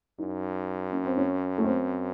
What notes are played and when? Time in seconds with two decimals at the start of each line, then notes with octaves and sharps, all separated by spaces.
0.19 F#2 D#4
0.93 C#4
1.05 C4
1.17 C#4
1.58 A3
1.64 C4